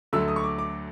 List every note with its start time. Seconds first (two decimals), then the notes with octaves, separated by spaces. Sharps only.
0.13 D2 D3 F#3 A3 E6
0.28 D#6
0.36 C#6
0.44 D6
0.58 D6